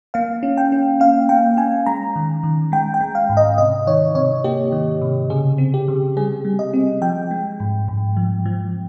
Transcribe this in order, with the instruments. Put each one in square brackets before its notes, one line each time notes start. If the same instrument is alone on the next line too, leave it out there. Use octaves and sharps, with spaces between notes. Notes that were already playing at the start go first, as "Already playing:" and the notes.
[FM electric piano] A#3 F5
C#4
G5
C#4
C#4 F5
A#3 G5
C#4 G#5
G#3 A#5
D#3
D#3
G#3 G5
G5
G#3
F5
G#2
D#5
C3 D#5
D#3 C#5
C3 C#5
A#3 G4
D#3
C3
C#3 G#4
C4
G4
C#3
G3 G#4
G3
D#5
C4
F3 G5
G#3
G#2
G#2
F3
F3